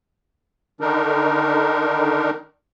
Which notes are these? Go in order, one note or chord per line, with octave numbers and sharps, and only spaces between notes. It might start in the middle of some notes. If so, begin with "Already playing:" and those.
D3 D#3 D4 D#4 A#4